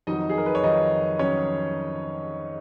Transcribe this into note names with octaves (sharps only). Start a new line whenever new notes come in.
F2 D#3 F#3 D#4 D#5
G#4
A#4
B4
C#5
F2 D#3 F#3 D#4 D#5
D#3 F#3 C#4 C#5